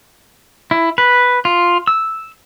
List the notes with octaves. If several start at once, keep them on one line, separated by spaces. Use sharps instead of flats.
E4
B4
F4
E6